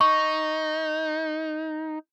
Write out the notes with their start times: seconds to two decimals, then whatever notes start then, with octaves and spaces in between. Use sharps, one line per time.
0.01 D#4 C#6